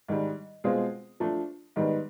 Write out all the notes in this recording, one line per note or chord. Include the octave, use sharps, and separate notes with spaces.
G#2 D#3 G3
B2 G#3 C4 F4 G#4
F3 A3 D4
G#2 D#3 G3 B3